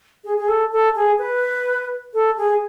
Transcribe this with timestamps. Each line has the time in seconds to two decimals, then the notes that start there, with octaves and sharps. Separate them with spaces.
0.24 G#4
0.38 G#4
0.48 A4
0.72 A4
0.95 G#4
1.19 B4
2.14 A4
2.37 G#4